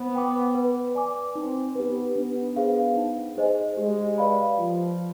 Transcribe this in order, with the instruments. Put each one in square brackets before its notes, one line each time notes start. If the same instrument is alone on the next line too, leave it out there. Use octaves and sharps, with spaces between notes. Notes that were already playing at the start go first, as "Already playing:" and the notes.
Already playing: [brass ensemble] B3 [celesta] C5
[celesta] G5 D6
B4
D5 G#5 D6
[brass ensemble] C4 [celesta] D#4
[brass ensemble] B3 [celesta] G4 B4
[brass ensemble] B3 [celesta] D4
[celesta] G#4 C5 F5
D#4
G#4 C5 D#5 G#5
[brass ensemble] G#3 [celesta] G4
[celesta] B4 D5 F5 B5
[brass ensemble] F3 [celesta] F4